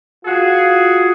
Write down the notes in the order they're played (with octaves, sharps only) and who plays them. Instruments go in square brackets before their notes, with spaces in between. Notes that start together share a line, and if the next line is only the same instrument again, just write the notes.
[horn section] F4 F#4 G#4